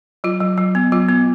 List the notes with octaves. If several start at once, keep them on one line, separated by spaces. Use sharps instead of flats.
F#3 F4
F#3
F#3
B3
F#3 F4
B3